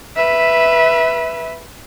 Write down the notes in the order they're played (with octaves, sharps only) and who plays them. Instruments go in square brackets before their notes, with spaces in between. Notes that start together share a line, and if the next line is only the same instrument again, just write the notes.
[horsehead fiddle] B4 E5